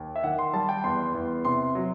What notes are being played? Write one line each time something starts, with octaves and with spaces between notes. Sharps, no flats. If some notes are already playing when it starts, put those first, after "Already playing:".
Already playing: D#2
E5
D#3 F#5
C6
G3 A5
G5
E2 C6
E2
C3 C6
F#3